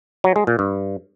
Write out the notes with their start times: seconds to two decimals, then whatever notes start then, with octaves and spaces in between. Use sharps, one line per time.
0.24 F#3
0.36 G#3
0.47 A#2
0.59 G2